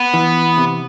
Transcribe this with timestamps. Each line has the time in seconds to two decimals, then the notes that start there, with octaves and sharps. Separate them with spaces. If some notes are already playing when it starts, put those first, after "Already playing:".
Already playing: B3
0.14 E3
0.57 C3